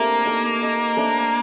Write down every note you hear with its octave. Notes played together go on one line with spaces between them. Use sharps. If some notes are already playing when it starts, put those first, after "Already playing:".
Already playing: A3 A#3 C4 D4 G4 A#4
D#4 A4 D#5
D#4 A4 D#5
A3 D4 A4 C5